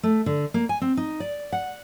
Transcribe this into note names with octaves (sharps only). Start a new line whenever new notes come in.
A3
D3
A#3
G#5
C4
D#4
D5
F#5